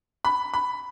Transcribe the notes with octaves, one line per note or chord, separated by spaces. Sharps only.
B5
B5